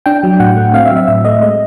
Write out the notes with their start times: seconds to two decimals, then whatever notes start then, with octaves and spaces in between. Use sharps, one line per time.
0.06 D4 G5
0.23 F#3
0.40 A2 F#5
0.57 A3
0.74 C4 F5
0.86 E5
0.91 F#3
0.97 E5
1.08 A2 E5
1.25 A3 D#5
1.42 G#3 D#5